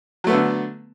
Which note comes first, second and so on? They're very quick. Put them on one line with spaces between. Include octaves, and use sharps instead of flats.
F#3 A3 B3 D3